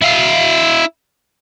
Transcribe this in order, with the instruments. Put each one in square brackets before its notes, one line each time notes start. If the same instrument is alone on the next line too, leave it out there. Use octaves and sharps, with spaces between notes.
[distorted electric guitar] E4 F5